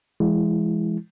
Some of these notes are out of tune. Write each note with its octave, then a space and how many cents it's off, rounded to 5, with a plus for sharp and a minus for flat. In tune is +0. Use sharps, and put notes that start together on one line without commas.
E3 +35 G#3 +0 E4 +5